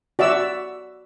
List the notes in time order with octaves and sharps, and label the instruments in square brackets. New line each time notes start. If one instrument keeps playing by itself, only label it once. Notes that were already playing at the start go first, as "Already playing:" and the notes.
[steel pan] F#4 D5 E5 E6